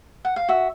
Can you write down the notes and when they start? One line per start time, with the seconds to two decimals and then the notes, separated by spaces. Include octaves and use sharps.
0.25 F#5
0.36 F5
0.49 F#4 E5